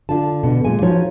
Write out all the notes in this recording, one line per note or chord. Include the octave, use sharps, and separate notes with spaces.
D3 D4 F4 A5
B2 D3
A#2 G#3 G#5
F3 D#4 F#4 C#5